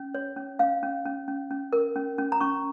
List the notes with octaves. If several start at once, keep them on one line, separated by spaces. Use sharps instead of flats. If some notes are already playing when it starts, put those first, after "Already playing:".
Already playing: C#4
C#5
C#4
C#4 F5
C#4
C#4
C#4
C#4
A#4
C#4
C#4
A#5
C#4 C#6